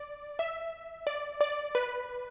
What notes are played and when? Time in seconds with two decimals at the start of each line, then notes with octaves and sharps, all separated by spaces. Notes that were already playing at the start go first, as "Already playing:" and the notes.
Already playing: D5
0.39 E5
1.07 D5
1.41 D5
1.75 B4